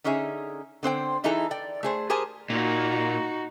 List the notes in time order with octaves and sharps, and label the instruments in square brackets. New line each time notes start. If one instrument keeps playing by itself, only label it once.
[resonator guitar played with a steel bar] D3 C#4 D#4 G#4 E5
D3 C4 C5 G5
E3 D#4 E4 G#4 A4 A#5
D5 G5
A3 G#4 C5
G4 G#4 A#4 C5 G#5 A5
[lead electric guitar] A#2 [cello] D#4 F#4